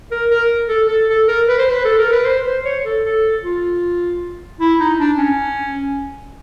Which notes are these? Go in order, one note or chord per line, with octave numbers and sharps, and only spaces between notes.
A#4
A#4
A4
A4
A4
A#4
B4
C5
B4
A4
A#4
B4
C5
C5
C#5
A4
A4
F4
E4
D#4
D4
C#4